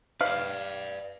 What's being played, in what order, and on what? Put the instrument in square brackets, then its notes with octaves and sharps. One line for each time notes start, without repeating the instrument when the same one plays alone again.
[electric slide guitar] B4 D5 [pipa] F5